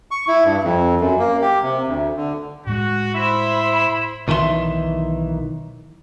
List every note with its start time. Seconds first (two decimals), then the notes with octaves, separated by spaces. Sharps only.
0.11 C#6
0.28 E4
0.45 G2
0.63 F2
1.00 F#2
1.19 A#3
1.41 G4
1.63 C3
1.87 D2
2.17 D3
2.67 A2 G#3 F#4
3.15 E4 C5 E5 B5
4.28 B1 D#3 E3 A4 E5 C6